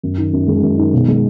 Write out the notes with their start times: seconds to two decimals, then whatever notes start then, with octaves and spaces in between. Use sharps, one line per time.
0.03 F#2
0.18 D#3
0.33 F#2
0.48 G#3
0.63 F#2
0.78 D#3
0.93 B2
1.08 G#3